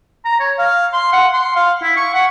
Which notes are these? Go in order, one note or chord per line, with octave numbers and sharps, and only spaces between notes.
A#5
C#5
F5
C6
F#5
C6
F5
E4
C#6
F#5